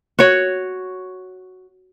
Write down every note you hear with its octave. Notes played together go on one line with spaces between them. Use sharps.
F#4 C#5